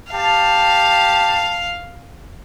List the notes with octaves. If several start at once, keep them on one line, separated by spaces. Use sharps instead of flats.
G4 F5 A5